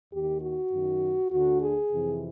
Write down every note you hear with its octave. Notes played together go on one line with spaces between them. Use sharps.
D#2 D#3 G4
F#4
F#2 D#3
D2 D3 F#4
G#4
F2 C3 E3